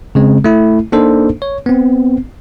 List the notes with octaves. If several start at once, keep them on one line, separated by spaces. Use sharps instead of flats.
C#3 G#3 C4
A3 E4
A#3 D4 D#4 A4 C5
C#5
B3 C4